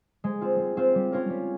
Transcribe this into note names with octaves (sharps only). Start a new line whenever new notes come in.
G#3
C4 F4
G#3
C4 F4
G3
C#4 F4 A#4 C#5
G3